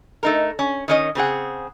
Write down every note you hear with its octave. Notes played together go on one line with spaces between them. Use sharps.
A3 D#4 A#4
C#4
D#3 C#4 D#5
C#3 C4 G#4 F#5